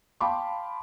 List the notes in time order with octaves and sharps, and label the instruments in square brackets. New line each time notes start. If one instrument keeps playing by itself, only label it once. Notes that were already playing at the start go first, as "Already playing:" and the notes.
[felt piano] F5 G5 A5 B5 C6 D6